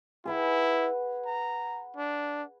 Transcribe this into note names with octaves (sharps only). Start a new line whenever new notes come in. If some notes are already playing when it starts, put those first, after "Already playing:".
E4 G#4 B4 F#5
A#5
D4